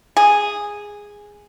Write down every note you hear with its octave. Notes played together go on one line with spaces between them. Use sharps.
G#4